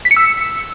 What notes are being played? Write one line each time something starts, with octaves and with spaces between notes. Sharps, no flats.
B6
C#7
E6